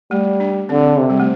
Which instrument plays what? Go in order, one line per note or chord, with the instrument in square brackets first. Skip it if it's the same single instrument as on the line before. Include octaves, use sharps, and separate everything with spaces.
[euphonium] G3 [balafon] A3
[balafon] D4
[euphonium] D3 [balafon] C4
[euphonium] C3
[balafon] G3
A3